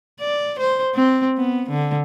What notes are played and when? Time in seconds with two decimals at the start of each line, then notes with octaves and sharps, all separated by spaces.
0.21 D5
0.59 C5
0.95 C4
1.38 B3
1.70 D3